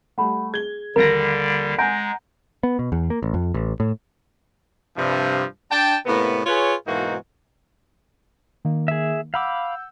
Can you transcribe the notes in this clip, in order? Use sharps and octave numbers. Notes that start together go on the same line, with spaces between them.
G3 A3 F#5 B5
G#4 G#6 G7
A#1 D#2 D3 G3 A#4 A#6
G#3 F#5 G#5 A#5 G6 A#6 D7
B3
B2
E2
A#3
A1
F2
A1
A2
G2 C3 F3
D4 G5 A5
A2 C3 A#3 B3
F4 G#4 B4 C#5
G#2 B2 E3 A#3 D#4 F#4
D#3 A#3
G#4 E5
F5 F#5 B5 D6 E6 G6